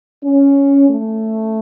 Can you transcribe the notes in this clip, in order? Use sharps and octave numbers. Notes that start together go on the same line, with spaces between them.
C#4
A3